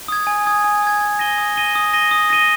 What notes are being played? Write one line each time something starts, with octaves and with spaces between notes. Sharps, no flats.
D#6 G#6
G#5
D#6 G#6
G#5
D#6 G#6
D#6
A#6 D#7 G7
D#6
A#6 D#7 G7
D#6
A#6 D#7 G7
D#6
A#6 D#7 G7